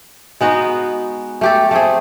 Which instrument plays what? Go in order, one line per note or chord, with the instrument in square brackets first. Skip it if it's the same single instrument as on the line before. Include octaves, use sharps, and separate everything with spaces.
[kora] G#3 B3 D#4 F#4
A3 G4 A4
A3 C4 G#4